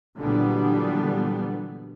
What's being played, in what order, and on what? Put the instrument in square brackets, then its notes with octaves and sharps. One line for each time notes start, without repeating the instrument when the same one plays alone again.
[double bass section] A#2 D3 E3 F#3 G3 B3